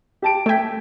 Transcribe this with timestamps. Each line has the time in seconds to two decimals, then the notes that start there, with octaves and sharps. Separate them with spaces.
0.22 G4 A5 D7
0.46 A3 E5 G5 G#6 B6